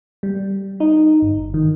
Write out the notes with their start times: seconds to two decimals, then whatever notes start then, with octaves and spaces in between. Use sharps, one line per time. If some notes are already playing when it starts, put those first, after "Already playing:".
0.23 G3
0.80 D#4
1.22 G1
1.54 D#3